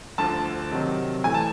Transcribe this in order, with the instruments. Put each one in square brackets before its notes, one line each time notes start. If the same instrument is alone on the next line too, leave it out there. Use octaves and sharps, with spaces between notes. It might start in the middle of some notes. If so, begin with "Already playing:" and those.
[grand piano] D2 D3 F3 A5
C3 D#3 F#3
A2 E3 A3 G#5
A5